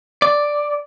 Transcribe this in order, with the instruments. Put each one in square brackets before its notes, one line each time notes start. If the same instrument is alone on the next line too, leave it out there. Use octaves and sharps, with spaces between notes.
[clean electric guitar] D5